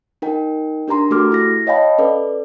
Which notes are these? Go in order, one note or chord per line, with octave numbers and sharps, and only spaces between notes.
D#4 A#4 G5
D4 G4 A#4 A#5 C6
A3 F#4 G4 A4 D6 F6
E4 A#6
C#5 D#5 F5 G5 A5 B5
C#4 A4 B4 D5